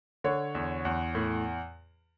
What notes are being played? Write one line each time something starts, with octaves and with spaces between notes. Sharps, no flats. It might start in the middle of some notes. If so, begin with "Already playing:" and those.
D3 C#5
E2
E2
A2